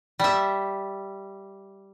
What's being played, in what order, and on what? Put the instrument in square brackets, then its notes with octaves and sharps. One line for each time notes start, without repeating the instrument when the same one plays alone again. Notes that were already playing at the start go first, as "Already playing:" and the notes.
[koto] G3 E5